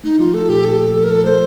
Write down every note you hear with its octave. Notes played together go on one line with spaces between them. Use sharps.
A3 D#4
F3 F4
A3 A4
A#2 G4
A#2 A4
A#2
F3 A4
A#4
F3 A4
A3 C5